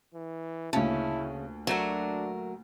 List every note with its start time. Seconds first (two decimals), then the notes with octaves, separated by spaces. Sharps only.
0.14 E3
0.73 D2 A#2 C#3 C#4 E4 A5
1.67 F#3 A3 D4 F#4 A#4